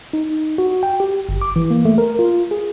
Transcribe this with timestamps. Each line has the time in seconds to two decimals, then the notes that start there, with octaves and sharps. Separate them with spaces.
0.13 D#4
0.58 F#4
0.83 G5
1.00 G4
1.29 G1
1.42 D6
1.56 E3
1.71 A#3
1.85 A3
1.98 A#4
2.19 F4
2.51 G#4